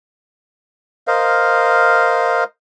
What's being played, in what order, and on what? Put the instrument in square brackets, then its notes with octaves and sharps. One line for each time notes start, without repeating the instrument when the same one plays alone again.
[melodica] A#4 C5 D#5 F5